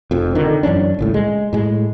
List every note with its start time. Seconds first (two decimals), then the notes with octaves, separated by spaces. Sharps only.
0.11 F1 F2
0.35 D3 D#3
0.63 F#2 E3 C#4 D4
0.99 D#1 C#2 A2
1.14 G#3
1.53 A2 G#3